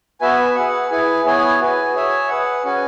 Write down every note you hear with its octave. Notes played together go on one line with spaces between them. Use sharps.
B3 F#4 B4 E5 G#5
G#4 B4 F#5
E4 G#4 B4 G#5
B3 E4 G#4 C#5 G#5
F#4 B4 G#5
G#4 C#5 E5 G#5
G#4 B4 F#5
C#4 F#4 B4 G#5